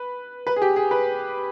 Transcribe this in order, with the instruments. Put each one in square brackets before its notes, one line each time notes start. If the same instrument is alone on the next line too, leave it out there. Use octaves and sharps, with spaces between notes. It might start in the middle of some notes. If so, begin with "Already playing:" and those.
Already playing: [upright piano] B4
B4
G#4
G4
G#4
B4